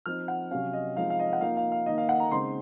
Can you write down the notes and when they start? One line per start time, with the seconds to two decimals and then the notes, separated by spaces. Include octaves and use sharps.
0.06 F3 C4 D#4 F6
0.28 F#5
0.51 C3 F#3 C#4 F5
0.73 D#5
0.96 F3 G#3 C4 D#4 F5
1.10 F5
1.19 D#5
1.33 F#5
1.41 F3 A#3 D#4 F5
1.57 F5
1.72 F5
1.86 D#3 A#3 D#4 D#5
1.98 F5
2.09 F#5
2.20 A#5
2.31 C#3 G#3 C4 D#4 C6